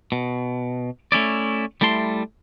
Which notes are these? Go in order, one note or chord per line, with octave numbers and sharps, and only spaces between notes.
B2
A3 C#4 E4 D5
G3 A3 E4 A5 C6